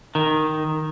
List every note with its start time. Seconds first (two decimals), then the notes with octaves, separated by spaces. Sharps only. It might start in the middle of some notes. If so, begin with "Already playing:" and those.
0.15 D#3